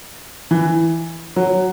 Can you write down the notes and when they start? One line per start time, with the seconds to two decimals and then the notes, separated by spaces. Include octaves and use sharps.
0.51 E3
1.36 F#3